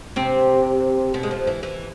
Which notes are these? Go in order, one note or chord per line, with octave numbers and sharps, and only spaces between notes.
C3 C4
B2 B3
G#3
F2 F3
E3
E3